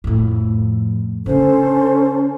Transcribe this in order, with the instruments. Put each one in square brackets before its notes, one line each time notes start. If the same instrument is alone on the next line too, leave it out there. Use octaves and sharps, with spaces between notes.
[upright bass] F2 A2
[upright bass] C#3 D4 [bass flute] C#4 [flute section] A4 C5